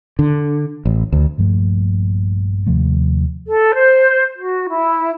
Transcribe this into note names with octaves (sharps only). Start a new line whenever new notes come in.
D3
A1
D2
A#1 G2 F3 A3
D#2 C3 F3 A3
A4
C5
F#4
E4